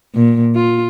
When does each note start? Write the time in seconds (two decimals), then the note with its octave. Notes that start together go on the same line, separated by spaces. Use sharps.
0.15 A#2
0.55 F4